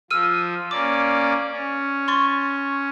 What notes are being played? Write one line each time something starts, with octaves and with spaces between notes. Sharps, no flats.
F3 E6 F6 D#7
A#3 C#4 D5 D6
C#4
C6 C#6 A6